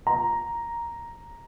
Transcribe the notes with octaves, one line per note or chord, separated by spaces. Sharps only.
A#5